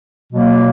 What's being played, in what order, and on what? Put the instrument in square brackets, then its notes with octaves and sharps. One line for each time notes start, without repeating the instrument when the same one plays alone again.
[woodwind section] B2 F#3 A#3